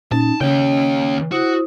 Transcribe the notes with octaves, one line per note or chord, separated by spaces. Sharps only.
A#2 C#4 D#4 A5
D#2 C#3 C#4 C#5 G5
E4 F#4 C5 D#6